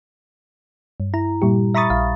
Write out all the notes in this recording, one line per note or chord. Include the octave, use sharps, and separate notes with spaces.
G2
E4 A#5
A#2 G3 G4
E5 A#5 B5 C#6 D#6 A6
A#1 F5